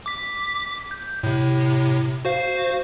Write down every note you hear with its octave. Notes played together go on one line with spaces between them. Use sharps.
D6 B6
G6
A2 C3
F#4 C5 F5